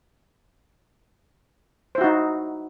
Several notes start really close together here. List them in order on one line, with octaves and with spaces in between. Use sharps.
C5 E4 F#4 D#4